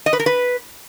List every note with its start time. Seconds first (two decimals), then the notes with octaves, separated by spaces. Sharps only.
0.06 D#5
0.13 B4
0.19 A#4
0.26 B4